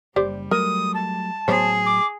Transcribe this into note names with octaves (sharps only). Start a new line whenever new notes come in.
F#1 G3 G4 C5 D5
F#3 A3 A#4 D#6
A5
A2 F#3 B3 G#4 C5 C#5
D6